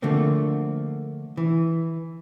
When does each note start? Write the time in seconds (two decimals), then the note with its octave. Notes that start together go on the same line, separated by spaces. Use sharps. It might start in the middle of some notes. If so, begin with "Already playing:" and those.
0.02 D3 F3 A3 A#3 C4
1.37 E3